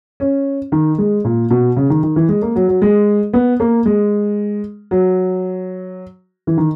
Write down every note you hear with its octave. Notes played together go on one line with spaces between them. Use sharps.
C#4
D#3
G#3
A#2
B2
C#3
D#3
D#3
E3
G#3
A#3
F#3
F#3
G#3
B3
A#3
G#3
F#3
E3
D#3